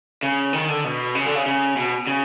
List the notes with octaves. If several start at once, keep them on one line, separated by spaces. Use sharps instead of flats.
C#3
D#3
D3
B2
C#3
D3
C#3
C#3
B2
C#3